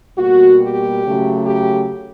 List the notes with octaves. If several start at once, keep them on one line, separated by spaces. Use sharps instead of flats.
B2 G3 A#3 F#4
G4
C#3 F#3 A3
G4